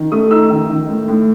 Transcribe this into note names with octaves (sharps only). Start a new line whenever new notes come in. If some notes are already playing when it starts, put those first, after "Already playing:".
Already playing: D#3
A3 D#6
D#4 E6
D#3
D#3
A2
A2